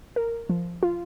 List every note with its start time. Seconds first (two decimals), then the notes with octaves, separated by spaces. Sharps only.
0.16 A#4
0.49 F3
0.83 F4